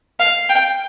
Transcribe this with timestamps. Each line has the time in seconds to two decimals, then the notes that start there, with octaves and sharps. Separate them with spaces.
0.20 F5
0.49 G5